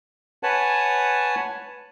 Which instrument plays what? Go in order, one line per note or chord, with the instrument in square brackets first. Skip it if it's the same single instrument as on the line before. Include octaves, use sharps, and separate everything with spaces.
[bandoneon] B4 C#5 F#5 G#5 A5